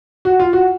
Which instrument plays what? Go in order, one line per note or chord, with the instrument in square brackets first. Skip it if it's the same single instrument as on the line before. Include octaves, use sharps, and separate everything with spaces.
[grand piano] F#4
F4
F#4